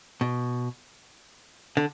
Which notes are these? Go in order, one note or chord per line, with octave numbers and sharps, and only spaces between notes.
B2
D3